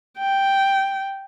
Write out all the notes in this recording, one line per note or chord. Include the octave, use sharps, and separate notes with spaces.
G5